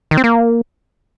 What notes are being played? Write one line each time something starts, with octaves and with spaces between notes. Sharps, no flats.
D#3
C4
A#3